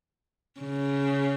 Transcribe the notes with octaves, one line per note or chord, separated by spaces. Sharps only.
C#3